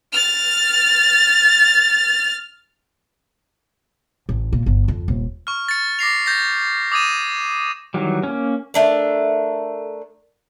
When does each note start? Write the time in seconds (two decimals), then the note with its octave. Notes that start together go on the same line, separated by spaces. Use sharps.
0.13 F6 A6
4.29 A1
4.53 A#2
4.66 G1
4.88 F2
5.08 D#1
5.47 C#6 F6
5.69 A6 C#7
5.99 D6 A#6 C7 F7
6.26 G6 A6 A#6
6.92 D6 D#6 G#6 D#7 E7
7.94 D#3 E3 F#3 G3
8.23 A#3 C#4
8.74 A3 D4 A#4